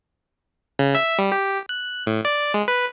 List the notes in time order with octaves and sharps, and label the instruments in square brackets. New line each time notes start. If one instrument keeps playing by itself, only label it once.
[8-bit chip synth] C#3
E5
G3
G4
F#6
A2
D5
G#3
B4